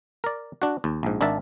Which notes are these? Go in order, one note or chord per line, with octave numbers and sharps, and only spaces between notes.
A#4 D5
D4 F#4
D#2
A#1 G#2
G#1 D4 A#4 E5 A5